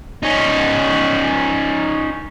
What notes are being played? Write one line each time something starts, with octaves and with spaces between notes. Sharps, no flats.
C#4 D#4